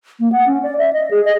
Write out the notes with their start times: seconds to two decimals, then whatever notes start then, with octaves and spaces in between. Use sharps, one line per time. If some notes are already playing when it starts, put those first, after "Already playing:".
0.20 A#3
0.32 F#5
0.47 C#4
0.63 D5
0.79 E5
0.93 D#5
1.11 G#4
1.25 D#5